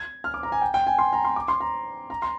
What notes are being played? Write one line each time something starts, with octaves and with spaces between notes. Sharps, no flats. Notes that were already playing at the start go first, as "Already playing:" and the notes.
Already playing: G#6
F6
D6
A#5
G#5
G5
G5
G#5
C6
A#5
C6
D6
C6
A#5
A#5
C6